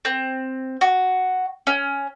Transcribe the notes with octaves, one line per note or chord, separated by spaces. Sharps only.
C4
F#4
C#4